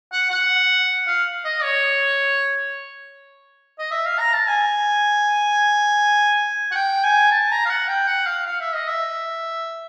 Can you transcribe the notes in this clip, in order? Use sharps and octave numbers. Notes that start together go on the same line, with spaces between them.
F#5
F#5
F5
D#5
C#5
D#5
E5
F5
A#5
A5
G#5
F#5
G5
G#5
A5
A#5
F5
F#5
G5
F#5
F5
F5
E5
D#5
E5